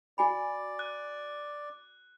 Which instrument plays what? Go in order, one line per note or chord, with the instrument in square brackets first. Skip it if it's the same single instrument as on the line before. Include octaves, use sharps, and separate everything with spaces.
[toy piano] F#4 G#5 B5 [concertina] D5
[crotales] F#6